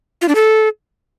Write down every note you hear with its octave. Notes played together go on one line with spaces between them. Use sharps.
F4
D4
A4